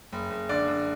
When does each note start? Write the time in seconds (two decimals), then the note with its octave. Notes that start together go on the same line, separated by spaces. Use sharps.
0.12 F#1
0.30 F#1
0.49 D3 D5
0.68 D3